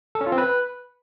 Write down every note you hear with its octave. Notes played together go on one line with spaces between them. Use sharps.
A4
C#4
F4
C4
B4